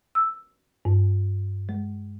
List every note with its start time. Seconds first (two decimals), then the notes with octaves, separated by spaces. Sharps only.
0.15 E6
0.85 G2
1.69 G#3